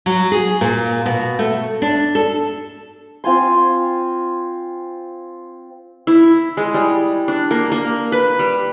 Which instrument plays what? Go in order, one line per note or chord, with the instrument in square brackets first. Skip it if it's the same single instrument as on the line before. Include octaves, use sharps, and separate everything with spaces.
[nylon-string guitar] F#3
G#4
A#2
B2
A3
D4
A4
[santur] C4 F4 G#5 C6
[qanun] E4
G#3
G3
D4
A#3
A#3
B4
G3